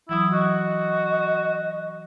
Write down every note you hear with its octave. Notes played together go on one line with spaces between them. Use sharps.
E3 F#3 E4 D#6
F#4 D#5